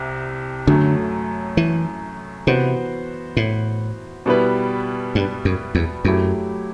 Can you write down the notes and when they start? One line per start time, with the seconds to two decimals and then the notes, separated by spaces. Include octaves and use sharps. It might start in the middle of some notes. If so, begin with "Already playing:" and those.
Already playing: C2 C3
0.67 F#2 D3 F#3 A3
1.57 E3
2.47 C3 E3 B3 F#4 C5
3.37 A2
4.26 B2 G3 B3 E4 B4
5.15 G2
5.45 F#2
5.75 E2
6.04 F#2 F#3 A3 E4 G4